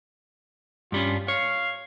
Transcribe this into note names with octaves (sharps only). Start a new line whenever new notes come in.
G2 G3 C#4 F4
C#5 F5